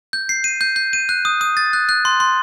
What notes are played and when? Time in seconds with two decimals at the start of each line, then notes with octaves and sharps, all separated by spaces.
0.13 G6
0.29 C7
0.44 D#7
0.61 G6
0.76 G6
0.93 D#7
1.09 F#6
1.25 D#6
1.41 D#6
1.57 A6
1.73 F#6
1.89 F#6
2.05 C6
2.20 C6